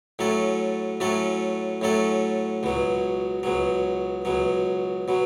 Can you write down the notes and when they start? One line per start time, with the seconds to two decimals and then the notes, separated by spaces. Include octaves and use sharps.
0.19 A2 F#3 C#4 A4
1.00 A2 F#3 C#4 A4
1.81 A2 F#3 C#4 A4
2.63 C#2 B2 F#3
3.43 C#2 B2 F#3
4.25 C#2 B2 F#3
5.08 B2 F#3